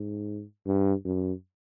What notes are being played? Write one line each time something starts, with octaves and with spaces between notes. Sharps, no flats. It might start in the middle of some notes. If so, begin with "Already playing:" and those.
Already playing: G#2
G2
F#2